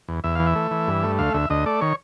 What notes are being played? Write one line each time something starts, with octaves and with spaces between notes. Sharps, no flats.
E2
E2 E5
E3 F5
E5
A3
E3
G2
A3
D2 F5
D2 E5
D2 D#5
A3 D5
D#3 C#5